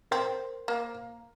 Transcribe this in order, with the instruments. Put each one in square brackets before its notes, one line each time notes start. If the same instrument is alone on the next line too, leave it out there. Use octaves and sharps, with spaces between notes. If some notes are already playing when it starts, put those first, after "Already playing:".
[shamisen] C4 [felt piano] A#4 C5
[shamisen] A#3